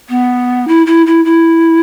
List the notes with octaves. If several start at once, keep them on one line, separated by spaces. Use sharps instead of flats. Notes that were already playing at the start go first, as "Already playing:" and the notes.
B3
E4
E4
E4
E4